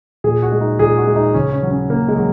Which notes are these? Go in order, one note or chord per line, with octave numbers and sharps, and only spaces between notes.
A#2 G#4
F#4
G#3
D#4
A#2 G#4
F#4
G#3
D#4
C#3 C#4
C#4
F#3
C#4
C#3 A#3
G#3
F#3